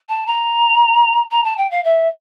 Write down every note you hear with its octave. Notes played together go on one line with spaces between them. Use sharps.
A5
A#5
A#5
A5
G5
F5
E5